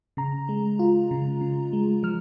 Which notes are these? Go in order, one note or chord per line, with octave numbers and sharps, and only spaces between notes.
C#3 A#5
G#3
F4
C#3
C#3
G#3
F3 F6